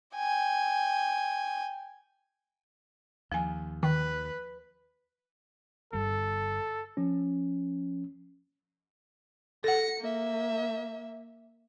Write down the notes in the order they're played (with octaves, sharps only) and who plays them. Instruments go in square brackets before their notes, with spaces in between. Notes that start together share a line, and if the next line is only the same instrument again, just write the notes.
[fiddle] G5 G#5
[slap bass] D#2 [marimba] F3 G#5
[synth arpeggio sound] D#3 [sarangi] B4
[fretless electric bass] G1 G2 [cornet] A4
[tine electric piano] F3 C#4
[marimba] A4 F#5 [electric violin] A#6 C#7
[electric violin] A#3 E5